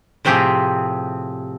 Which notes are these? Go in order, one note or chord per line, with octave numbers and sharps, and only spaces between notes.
A2 C3 F3 C4 G4 G#4